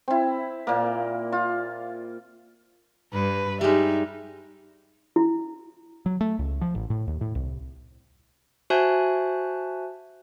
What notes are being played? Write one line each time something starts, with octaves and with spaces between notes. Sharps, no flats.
C4 E4
A#2 A#3
F4
G2 B4
G3 G#3 D#4 E5
E4
F#3
A3
C#2
F3
A1
A2
D#2
A2
C2
F#4 C5 E5 G#5 A5 F#6